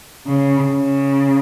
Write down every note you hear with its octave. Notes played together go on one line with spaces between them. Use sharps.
C#3
C#3